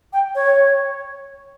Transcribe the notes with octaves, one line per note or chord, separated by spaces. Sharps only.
G5
C#5